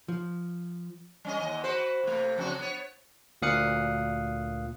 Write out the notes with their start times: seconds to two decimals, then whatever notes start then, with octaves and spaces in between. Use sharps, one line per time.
0.08 F3
1.25 G3 C#4 D#5
1.40 D#2 D#5
1.64 F#4 B4 C5
2.04 C3 A3
2.37 F2 C#3 F#4
2.59 B3 C#5
3.42 D2 A#2 F5 D#6 F#6 C#7